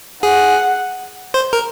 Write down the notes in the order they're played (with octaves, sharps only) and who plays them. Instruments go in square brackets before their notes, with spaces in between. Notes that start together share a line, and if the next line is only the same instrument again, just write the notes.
[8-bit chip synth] G#4 [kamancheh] F#5
[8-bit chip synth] C5
A#4